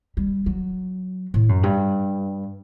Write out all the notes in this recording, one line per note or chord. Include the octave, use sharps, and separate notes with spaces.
G3
F#3
A2
F#2
G2